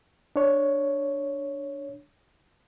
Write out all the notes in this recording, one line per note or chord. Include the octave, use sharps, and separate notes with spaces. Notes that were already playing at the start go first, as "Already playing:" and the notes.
D4 C#5